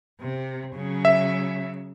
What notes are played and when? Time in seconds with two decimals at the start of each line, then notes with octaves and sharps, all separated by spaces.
0.20 C3
0.75 C#3 F#3
1.05 E5